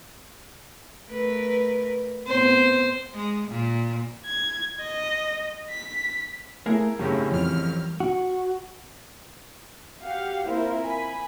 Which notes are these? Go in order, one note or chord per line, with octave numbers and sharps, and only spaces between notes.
A3 A#4 B4
A2 B3 C4 C5
G#3
A#2
G#6
D#5
B6
A3 A#3 E4 G#4 A#4
G#1 F#2 A2 C#3 G3
F2 E3 F6
F#4
F#4 G4 F5 F#5
A#3 C4 E4 F4 A#4 C5
G#5 B5